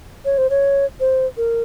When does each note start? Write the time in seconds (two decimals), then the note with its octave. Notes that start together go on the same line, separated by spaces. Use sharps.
0.25 C#5
0.37 C5
0.50 C#5
1.00 C5
1.37 A#4